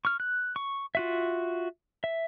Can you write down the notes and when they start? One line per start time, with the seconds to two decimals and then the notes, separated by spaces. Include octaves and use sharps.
0.05 C#6 F6
0.20 F#6
0.56 C#6
0.95 F4 F#4 E5
2.04 E5